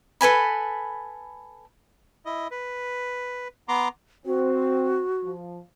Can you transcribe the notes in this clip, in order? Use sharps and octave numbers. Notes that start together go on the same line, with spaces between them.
A4 B4 G#5 B5
E4 D#5
B4
B3 A#5 C6 D6
C4 F#4
F3